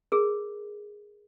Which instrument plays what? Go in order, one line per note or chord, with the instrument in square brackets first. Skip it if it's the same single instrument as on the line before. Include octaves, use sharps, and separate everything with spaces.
[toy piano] G#4 A#4